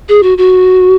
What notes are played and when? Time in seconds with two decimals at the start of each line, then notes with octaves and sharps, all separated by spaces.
0.09 G#4
0.23 F#4
0.38 F#4